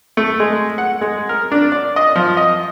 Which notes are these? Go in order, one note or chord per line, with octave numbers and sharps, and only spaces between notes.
A3
G#3
F#5
G#3
A#4
D4
D5
D#5
F3
D#5